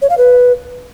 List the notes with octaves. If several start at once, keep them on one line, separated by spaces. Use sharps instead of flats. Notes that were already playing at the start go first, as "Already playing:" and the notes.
C#5
F5
B4